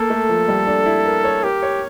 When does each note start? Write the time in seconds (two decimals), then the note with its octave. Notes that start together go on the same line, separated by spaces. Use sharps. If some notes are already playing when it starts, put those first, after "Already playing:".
Already playing: A#3 A4
0.10 A3
0.29 F3
0.48 G3
0.67 D4
0.86 E4
1.05 A#4
1.24 C#5
1.43 G4 A#4
1.63 C#5